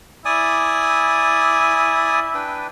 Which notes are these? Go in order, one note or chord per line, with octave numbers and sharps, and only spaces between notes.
E4 D5 G#5 D#6
D4 B4 G5